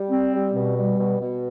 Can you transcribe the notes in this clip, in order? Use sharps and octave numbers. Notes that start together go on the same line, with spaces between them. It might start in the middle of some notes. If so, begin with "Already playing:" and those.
Already playing: G3
C4
G3
B2
G3
B2
B2